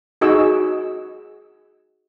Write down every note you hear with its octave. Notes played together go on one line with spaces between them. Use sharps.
D#4 F#4 G#4 D#5 E6